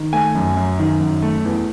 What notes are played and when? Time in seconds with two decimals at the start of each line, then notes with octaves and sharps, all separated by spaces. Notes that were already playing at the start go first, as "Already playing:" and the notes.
Already playing: D#3
0.13 A3 G#5
0.35 F#2
0.57 F#2
0.79 D#3
1.01 F#2
1.22 A3
1.45 E2